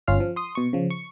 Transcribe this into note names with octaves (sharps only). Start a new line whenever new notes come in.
G1 C#4 F4 F5 F6
F3
C6 D#6
B2 C#6
C#3 F3
C#6